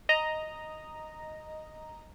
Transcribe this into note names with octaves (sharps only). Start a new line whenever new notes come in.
D#5 A#5